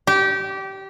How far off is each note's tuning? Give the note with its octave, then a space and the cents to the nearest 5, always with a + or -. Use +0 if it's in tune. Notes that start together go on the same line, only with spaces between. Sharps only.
G4 -20